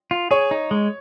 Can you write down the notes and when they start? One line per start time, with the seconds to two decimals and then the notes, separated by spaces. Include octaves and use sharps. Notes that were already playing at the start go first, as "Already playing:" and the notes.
0.11 F4
0.31 G#4 C#5
0.51 D#4
0.71 G#3